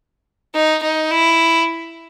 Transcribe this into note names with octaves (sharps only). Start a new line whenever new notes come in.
D#4
D#4
E4